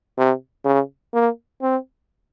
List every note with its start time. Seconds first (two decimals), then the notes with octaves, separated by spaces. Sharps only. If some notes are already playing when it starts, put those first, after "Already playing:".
0.18 C3
0.65 C#3
1.14 A#3
1.62 C4